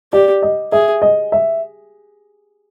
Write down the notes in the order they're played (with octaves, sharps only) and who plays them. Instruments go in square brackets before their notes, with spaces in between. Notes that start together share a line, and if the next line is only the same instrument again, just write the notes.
[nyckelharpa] G4 [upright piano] D5
[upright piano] D#5
[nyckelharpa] G#4 [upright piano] E5
[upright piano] D#5
E5